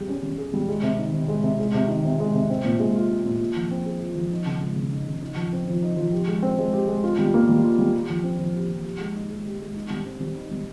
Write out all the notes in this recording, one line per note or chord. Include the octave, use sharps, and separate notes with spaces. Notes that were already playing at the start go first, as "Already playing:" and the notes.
Already playing: G3 G#4
C#4
G3
G#4
G3
G#3
C3
D#3
C3
G#3
C3
G#3
C3
D#3
C3
G#3
C3
C4
A#2
G#3
F4
C4
A#2
F4
F3
C4
G#4
F4
F3
D#4
C#3
G#3
C#3
D#4
C#3
D#4
F3
C4
F3
D#4
F3
G4
G#3
C4
G#3
G4
G#3
F4
G3
A#3
G3
F4
G3
G4
F3
C4
F3
G4
F3
G4
G#3
D#4
G#3
G4
G#3
D#4
G3
C4
G3
D#4
G3